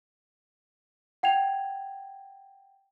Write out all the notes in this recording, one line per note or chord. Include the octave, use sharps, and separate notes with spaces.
F#5 G5 G#6 F7